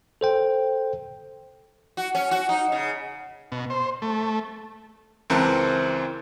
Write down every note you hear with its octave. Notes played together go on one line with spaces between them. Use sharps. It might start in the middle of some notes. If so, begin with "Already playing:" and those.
A4 C5 G5
F#4
C#4
F#4
D#4
C#3
B2
C5
A3
C#2 E3 C4 A#4 C5 A5